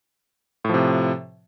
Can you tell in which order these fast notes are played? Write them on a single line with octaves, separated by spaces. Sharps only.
A2 F3 C3